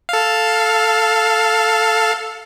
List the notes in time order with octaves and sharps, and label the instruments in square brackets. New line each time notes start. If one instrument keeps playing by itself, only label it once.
[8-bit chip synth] A4 F5